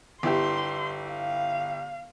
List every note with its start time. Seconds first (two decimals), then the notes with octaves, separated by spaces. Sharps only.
0.23 G1 E4 G4 C6
1.12 F5